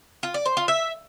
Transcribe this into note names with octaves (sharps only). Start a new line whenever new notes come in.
F4
D5
C5
F4
E5